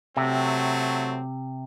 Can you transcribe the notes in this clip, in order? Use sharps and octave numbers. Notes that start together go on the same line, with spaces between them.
C3 F#3 A3 C4